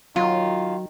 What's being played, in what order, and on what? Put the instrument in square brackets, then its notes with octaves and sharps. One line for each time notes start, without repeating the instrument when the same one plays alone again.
[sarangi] D#3 [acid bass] F#3 [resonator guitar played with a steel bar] F4